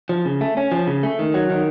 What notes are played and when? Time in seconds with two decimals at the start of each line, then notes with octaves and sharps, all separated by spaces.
0.09 F3
0.25 C#3
0.41 A3
0.57 C#4
0.72 F3
0.87 C#3
1.03 A3
1.19 D#3
1.34 F#3
1.50 D#3